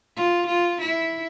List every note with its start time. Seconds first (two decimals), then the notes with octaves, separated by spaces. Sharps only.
0.16 F4
0.46 F4
0.81 E4